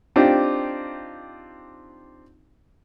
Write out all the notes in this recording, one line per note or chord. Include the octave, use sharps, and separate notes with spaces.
C4 D4 D#4 F4 G4